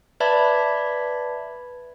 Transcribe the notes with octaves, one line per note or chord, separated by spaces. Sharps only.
B4 D5 E5 A5 B5 G#6